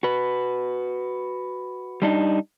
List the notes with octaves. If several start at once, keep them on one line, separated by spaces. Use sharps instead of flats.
F#4 B4
G3 D4 D#4